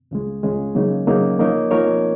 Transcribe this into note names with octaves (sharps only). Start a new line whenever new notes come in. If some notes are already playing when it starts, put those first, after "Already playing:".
C#2 C#3 G#3
C#2 C#3 G#3
C#3 F#3 A#3 D#4
C#3 F#3 A#3 D#4
F3 A#3 D#4 A#4 C#5
F3 A#3 D#4 A#4 C#5